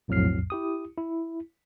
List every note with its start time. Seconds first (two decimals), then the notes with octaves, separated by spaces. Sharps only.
0.08 B1 F2 A2 F#3 F6 C7
0.50 E4 G4 D#6
0.98 E4